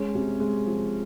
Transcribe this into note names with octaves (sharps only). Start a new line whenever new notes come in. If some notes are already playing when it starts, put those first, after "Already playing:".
Already playing: G#3 C#4
C3
G#3
F3